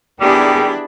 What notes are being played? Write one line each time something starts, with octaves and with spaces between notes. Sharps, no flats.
D#3 G3 B3 D4 E4 G4 G#4 B5